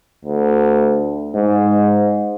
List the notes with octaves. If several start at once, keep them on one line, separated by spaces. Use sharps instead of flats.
D2
G#2